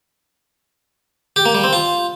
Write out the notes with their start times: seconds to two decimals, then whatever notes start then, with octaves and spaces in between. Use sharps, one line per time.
1.36 G4
1.45 A#3
1.55 G3
1.64 C4
1.73 F4